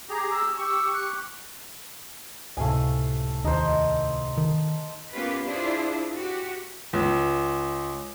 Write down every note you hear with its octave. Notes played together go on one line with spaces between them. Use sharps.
G4 G#4 A#5
E6
G4 C#6 E6
F#6
C#2 A2 C3 A3 F5 G#5
D#2 D#4 C5
D#3
A#3 B3 C#4 F4 G4 B4
D4 E4 F4 G#4 C5
F#4 G4
C#2